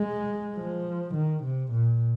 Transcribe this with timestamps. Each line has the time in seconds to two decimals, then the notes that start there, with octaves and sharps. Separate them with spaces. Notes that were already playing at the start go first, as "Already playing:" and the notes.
Already playing: G#3
0.57 F3
1.14 D#3
1.43 C3
1.72 A#2